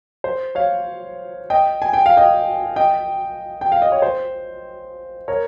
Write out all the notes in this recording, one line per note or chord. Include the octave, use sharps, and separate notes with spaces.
C5
C#5 F5
D#5 G5
G#5
G5
F5
D#5 G5
D#5 G5
G5
F5
D#5
C#5
C5
A#4 C#5